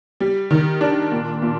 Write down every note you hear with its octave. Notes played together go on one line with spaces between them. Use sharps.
G3
D#3
D4
A#2
A#2